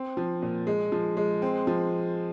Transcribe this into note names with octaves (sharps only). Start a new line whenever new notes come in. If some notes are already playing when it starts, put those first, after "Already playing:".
Already playing: C4
F3
A#2
G#3
F3
G#3
C4
F3